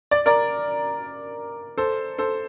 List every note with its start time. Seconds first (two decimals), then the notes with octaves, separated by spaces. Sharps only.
0.11 D5
0.26 A#4 D5
1.77 A4 C5
2.18 A4 C5